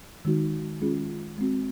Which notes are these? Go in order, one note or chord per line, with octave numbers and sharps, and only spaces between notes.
D#3 G#3 D#4 F#4
G#3 C#4 F4 G#4
G#3 C4 F#4